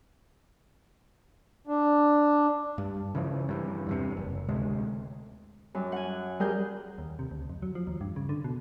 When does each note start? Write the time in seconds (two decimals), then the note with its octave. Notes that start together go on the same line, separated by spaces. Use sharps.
1.67 D4
2.78 G2
3.15 C#3 E3 F3
3.49 G2 E3
3.87 E2 G2 C3
4.17 F#1
4.48 D1 D2 C3 G#3
5.75 F#2 G3
5.92 F#5 G#5
6.40 G3 G#4 A#4 G6
6.98 D#2
7.19 C3
7.31 D2
7.50 F2
7.62 F#3
7.75 F3
7.87 D#2
8.01 G2
8.16 C#3
8.29 D3
8.44 B2